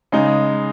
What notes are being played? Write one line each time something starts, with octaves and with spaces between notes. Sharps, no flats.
C#3 G#3 D#4